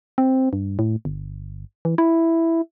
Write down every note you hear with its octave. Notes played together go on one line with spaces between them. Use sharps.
C4
G2
A2
G1
E3
E4